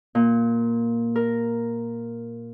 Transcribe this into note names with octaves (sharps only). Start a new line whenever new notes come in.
A#2
A#4